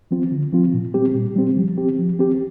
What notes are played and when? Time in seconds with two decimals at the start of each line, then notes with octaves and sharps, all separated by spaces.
0.11 F3 C4 F4
0.32 D3
0.53 F3 C4 F4
0.74 A#2
0.94 G3 C4 G4
1.15 A#2
1.36 G3 C4 G4
1.57 F3
1.78 C4 G4
1.98 F3
2.19 C4 G4